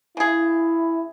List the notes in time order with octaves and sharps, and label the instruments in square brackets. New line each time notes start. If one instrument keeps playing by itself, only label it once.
[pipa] C#3 G#4 [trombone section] E4